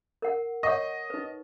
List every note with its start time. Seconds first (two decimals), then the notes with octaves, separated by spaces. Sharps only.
0.22 A#4 F#5
0.63 C#5 D#5 F#5 C#6
1.10 D#4 B4